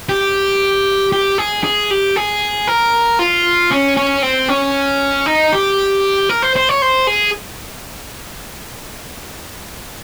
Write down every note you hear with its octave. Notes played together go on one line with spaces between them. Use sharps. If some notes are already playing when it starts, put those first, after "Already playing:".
G4
G4
G#4
G#4
G4
G#4
A#4
F4
C#4
C#4
C4
C#4
D#4
G4
A#4
C5
C5
C#5
C5
G#4